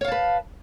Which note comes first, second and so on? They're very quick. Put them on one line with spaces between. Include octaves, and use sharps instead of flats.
C#5 F5 A5 B4